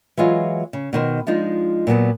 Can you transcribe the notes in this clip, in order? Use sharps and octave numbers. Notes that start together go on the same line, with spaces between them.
E3 F#3 G#3 F4 G#4 D#5
C#3
B2 D#3 C5
F3 G#3 D4 D#4 F4
A#2 F#3 B3 A5